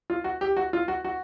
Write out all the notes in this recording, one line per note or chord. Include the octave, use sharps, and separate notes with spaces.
F4
F#4
G4
F#4
F4
F#4
F#4